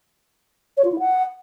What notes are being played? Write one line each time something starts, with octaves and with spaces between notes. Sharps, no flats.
C#5
F4
E4
F#5